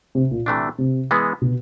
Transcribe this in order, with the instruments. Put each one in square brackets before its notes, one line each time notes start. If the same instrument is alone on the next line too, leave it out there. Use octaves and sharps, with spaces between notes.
[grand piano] C3
A#2
[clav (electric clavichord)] C3 E3 A3 D4
[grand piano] C3
[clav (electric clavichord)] E3 G#3 B3
[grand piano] B2